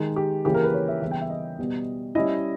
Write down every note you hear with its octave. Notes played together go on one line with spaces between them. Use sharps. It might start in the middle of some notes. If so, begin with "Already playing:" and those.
Already playing: D#3 G#3 D#4 G4
G4
C#3 E3 A#3 C#4 E4 G4
A#4
B4
C#5
E5
C#3 E3 G3 B3 E5
G5
E5
D#5
B2 G3 B3
G3 C#4 E4 D#5